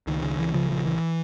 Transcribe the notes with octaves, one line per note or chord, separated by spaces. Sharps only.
C#2 D#3
C#3
C#2 E3
C#3 F3
A#1 F3
A#1 E3